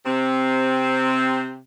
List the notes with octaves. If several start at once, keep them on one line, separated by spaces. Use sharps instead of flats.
C3 C4